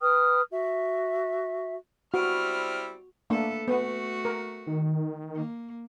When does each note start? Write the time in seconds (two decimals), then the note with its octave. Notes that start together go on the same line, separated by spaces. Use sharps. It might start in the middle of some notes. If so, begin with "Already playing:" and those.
0.01 B4 G5 D#6 F6
0.51 F#4 E5
2.14 G3 C4 E4 F#4 F6
3.30 A3 A#3 D4 A4 B4
3.68 A3 B3 F#4
4.25 A#4
4.67 D#3
5.35 A#3